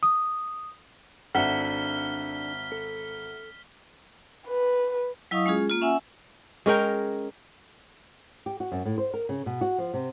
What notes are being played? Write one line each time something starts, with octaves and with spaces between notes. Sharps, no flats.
D#6
G#1 D4 A4 E5 F#5 F6 B6 G7
A4
B4
F#3 E4 D#5 F5 C#6 D#6
G#3 C#4 F4 G#4
A#3 F4
C#4 E5 F#5 G#5 E6
G#3 C#4 A#4 G5
G4
F#4
F#2
A2
C5
A#4
C#3
B2
F#4
F3
C3